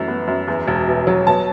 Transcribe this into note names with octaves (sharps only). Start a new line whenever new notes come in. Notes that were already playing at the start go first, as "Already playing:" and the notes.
Already playing: F#2 E3 A3
B3
F#2
E2
E1
B2
F#3
B2 A5